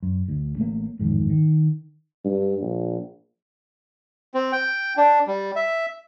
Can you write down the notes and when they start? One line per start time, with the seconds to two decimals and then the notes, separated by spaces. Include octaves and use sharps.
0.03 F#2
0.28 D2
0.57 A1 A2 A3 A#3
0.99 A1 F2 G#2 D#3
1.30 D#3
2.25 G2
2.61 A#1
4.34 C4
4.52 G5
4.97 D4
5.27 G3
5.56 E5